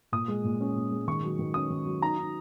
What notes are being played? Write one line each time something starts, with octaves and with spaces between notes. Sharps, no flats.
A#2 D#6
G#3
A#2
C#4
A#2
G#3
D#3 C#6
F#3
D#3
C#4 D#6
D#3
F#3
D#4 A#5
D#4